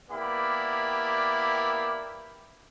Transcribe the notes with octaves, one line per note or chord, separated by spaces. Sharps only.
A#3 B3 E4 G4 D5 B5